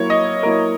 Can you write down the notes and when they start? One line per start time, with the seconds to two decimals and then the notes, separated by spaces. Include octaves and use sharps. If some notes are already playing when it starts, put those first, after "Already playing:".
Already playing: F#3 A#3 E4 C#5
0.10 D#5
0.43 F#3 A#3 E4 A#4